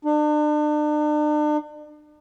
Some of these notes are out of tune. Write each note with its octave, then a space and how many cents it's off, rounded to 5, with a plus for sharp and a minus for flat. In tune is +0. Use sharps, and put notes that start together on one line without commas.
D4 +40